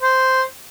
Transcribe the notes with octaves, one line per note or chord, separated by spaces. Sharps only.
C5